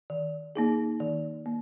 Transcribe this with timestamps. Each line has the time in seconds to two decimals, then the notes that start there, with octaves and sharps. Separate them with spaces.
0.10 D#3
0.56 A#3 D#4 G#4
1.00 D#3
1.46 A#3